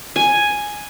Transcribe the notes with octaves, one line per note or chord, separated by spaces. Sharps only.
G#5